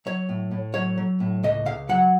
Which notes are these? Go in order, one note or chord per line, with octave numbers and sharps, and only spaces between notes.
F#3 C#5
A2
A2
F#3 C#5
F#3
A2
C#2 D#5
C#2 F5
F#3 F#5